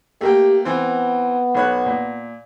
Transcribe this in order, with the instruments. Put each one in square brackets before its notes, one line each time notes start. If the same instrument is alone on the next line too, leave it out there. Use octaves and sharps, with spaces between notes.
[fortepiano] A3 A#3 G5 [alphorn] G4
[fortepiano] E3 C4 [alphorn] B3
[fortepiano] B1 C#5 F#6
A#2